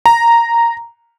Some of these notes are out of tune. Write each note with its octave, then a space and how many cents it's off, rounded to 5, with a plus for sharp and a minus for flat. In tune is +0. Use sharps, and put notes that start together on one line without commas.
A#5 -5